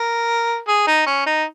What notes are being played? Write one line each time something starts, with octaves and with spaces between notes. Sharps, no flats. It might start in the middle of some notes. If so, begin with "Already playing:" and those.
Already playing: A#4
G#4
D#4
C#4
D#4